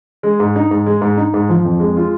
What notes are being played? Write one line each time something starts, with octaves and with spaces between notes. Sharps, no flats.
G#3
G#2
D#4
G#2
G#3
G#2
D#4
G#2
F3
F2
G#3
F4